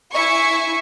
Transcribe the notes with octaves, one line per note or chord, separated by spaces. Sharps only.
E4 E5 G#5 C#6